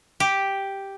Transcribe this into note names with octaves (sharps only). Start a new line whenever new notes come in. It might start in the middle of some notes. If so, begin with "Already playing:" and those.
G4